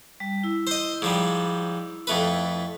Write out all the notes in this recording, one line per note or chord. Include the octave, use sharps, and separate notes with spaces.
G3
E4 E6
C5 D#5
G#2 F3 G3
F2 A3 B4